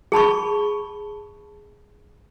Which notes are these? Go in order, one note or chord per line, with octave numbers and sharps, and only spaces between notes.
G#4 A5 B5 C#6